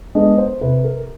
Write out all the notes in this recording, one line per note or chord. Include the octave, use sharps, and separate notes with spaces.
G#3 B3 D4 D#5
C5
C3 B4
A#4